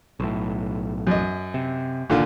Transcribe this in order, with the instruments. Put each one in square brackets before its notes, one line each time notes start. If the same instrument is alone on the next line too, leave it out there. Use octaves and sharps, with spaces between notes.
[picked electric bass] B1 A2
[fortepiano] F#2 D#5
[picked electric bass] C3
[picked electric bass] G#1 [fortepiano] A#2 D3 F4